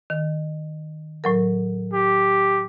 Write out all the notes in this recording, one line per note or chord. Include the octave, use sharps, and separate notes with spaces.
D#3
A2 F#3 A#4
G4